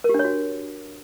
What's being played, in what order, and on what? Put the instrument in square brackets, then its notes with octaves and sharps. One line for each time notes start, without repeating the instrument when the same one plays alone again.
[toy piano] A#4
G4
D4
C#5
F#4